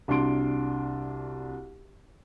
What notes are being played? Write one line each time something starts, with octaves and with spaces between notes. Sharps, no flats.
C2 D4 F#4 C6 D7